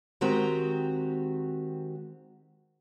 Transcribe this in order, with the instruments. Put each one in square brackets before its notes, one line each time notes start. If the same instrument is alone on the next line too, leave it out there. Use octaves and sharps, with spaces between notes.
[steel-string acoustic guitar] D#3 G#3 C4 F#4 G4 A#5